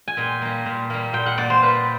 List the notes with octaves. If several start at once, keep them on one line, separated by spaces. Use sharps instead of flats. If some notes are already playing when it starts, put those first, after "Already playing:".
G#5
A#2 G5
G3 A#3
A#2
G3 A#3
A#2 G5
F#5
G3 A#3 D5
C5
A#2 B4